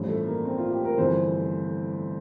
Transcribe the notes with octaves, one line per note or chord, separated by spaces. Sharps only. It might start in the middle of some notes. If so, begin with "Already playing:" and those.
Already playing: A1 G2 F3
A3
A#3
C4
F4
G4
A#4
G1 F2 E3 C5